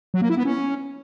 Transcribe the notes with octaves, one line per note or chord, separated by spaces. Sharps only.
F#3
A#3
E4
B3
C#4